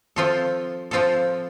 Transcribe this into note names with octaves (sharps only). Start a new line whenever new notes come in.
F3 C4 F4 A4
F3 C4 F4 A4